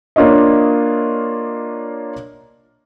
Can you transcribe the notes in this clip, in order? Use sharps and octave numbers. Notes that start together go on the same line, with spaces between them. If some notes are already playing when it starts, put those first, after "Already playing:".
A#3 D4 F4 C#5 D#5